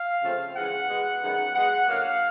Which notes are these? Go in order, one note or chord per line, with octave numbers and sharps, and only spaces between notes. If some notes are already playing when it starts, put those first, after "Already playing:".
Already playing: F5
C#3 F3 A3 C4
C#3 E3 G#3 F#5
B2 G#3 B3
F#2 D#3 G#3 B3
B2 G#3 B3 F#5
D3 F#3 A#3 F5